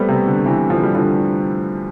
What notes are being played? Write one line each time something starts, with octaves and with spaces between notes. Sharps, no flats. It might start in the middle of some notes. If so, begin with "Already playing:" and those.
Already playing: G3 A3 B3 C4
C3
D3
C3 E3
D3 F3
G3
D3 F3